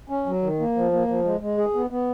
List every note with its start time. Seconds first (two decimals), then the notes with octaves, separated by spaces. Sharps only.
0.09 C#4
0.26 F#3
0.43 D#3
0.60 A#3
0.76 F3
0.92 A#3
1.08 F3
1.25 G#3
1.41 G#3
1.58 G#4
1.75 B3
1.90 B3